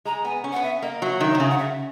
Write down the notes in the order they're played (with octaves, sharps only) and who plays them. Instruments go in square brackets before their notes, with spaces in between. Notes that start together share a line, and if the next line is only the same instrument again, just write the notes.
[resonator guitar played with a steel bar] G#3 [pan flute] A#5
[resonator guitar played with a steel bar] B3 [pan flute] G#5
[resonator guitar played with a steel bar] C#4
[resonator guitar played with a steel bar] B3 [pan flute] F#5
[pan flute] E5
[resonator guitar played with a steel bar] A#3 [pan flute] D#5
[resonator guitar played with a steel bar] F#3 [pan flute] E5
[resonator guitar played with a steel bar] D#3 [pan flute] E5
[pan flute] C#5
[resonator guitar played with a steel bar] D#3
[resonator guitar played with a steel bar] C#3 [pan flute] E5
[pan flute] F#5
E5